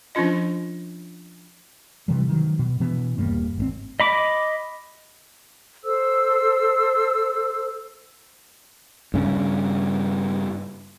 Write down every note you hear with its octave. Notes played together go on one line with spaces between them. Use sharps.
F3 C#4 D4 F4 D#5
C3 E3 G3
D#3 F#3
B2
B2 E3 B3
D#1 G2 G3 A#3
G#1 E3 C4
D#5 B5 D6
A4 C5 E6
G2 C#3